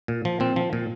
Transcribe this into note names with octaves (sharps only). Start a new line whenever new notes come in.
A#2
F3
A#2 C4
F3
A#2